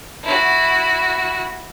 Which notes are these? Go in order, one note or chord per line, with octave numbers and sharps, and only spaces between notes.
E4 F#4